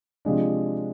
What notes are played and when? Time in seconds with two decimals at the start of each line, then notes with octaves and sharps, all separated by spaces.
0.25 C3 F3 G#3 D4